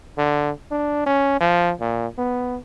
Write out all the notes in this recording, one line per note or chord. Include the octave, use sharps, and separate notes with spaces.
D3
D4
C#4
F3
A#2
B3